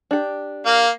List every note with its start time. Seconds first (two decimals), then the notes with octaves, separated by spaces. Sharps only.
0.11 D4 G4
0.66 A#3 F5